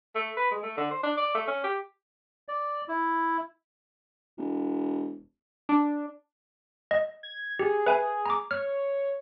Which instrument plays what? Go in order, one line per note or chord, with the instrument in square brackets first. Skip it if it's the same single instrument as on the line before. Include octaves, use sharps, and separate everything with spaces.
[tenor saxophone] A3
B4
G#3
A3
D3
C5
D4
D5
A3
C#4
G4
[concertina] D5
E4
[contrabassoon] E1
[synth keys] D4
[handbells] D#5
[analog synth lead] G#6
[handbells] G4 [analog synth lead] G#4
[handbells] B4 E5 G#5
A#5 D6
[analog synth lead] C#5 [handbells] F6